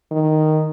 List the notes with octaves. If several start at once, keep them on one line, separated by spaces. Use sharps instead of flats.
D#3